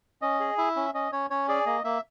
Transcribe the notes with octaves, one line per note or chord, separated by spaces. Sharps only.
C#4 D#5
G#4
E4 E5
C#4
C#4 D#5
C#4 C#5
C#4 C#5
G#4 D5
A#3 D#5
A#3 E5